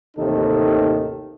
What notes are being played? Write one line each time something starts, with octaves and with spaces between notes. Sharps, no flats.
A1 D#2 C3 D#3 D#4 A4